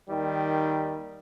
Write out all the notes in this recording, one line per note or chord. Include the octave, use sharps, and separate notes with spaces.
D#2 D#3 G3